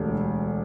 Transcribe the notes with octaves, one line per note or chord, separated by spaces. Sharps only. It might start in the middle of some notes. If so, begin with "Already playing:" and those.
Already playing: E1 D2 D3 A3 G4